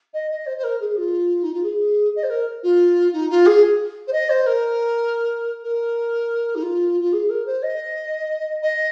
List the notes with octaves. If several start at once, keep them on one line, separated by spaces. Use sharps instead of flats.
D#5
D#5
C5
C5
A#4
G#4
F4
D#4
F4
G#4
D#5
C5
A#4
F4
D#4
F4
G#4
C5
D#5
C5
A#4
A#4
D#4
F4
F4
G#4
A#4
C5
D#5
D#5